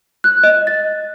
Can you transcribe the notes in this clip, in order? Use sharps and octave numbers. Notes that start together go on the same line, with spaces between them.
F#6
D#5
A6